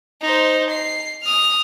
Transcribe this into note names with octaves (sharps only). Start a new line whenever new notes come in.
D#4 C5
C7
D#6 F6